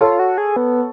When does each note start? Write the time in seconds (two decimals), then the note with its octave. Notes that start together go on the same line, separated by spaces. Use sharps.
0.01 F4 A4 C#5
0.19 F#4
0.38 G#4
0.56 B3